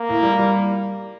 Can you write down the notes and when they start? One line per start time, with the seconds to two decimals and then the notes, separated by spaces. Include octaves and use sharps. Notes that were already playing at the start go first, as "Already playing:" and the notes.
Already playing: A#3
0.09 A2
0.23 G3
0.39 G3